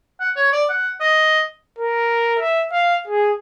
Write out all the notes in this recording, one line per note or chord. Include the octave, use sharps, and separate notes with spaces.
F#5
C#5
D5
F#5
D#5
A#4
E5
F5
G#4